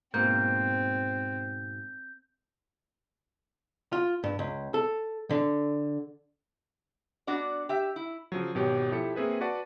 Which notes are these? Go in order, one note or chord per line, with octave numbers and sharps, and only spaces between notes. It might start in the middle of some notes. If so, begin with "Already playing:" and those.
G#2 B2 A#3 C4 G6
F4
G2
C#2
A4
D3
B3 D4 F#4 D5
G4 E5
E4
C#3 F3 F#3
G#1 B2 G4 C#5
F3 E4 G4 A4 C#7
A#3 C4 G#4 B4 E5
F#4 B4 D5 F#5 A5